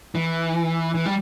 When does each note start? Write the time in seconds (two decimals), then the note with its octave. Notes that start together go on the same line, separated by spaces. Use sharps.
0.15 E3
0.95 E3
1.06 G3